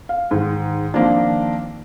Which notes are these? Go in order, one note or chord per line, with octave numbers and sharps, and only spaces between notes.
F5
G#2 D#3
D#3 F3 A#3 C4 D4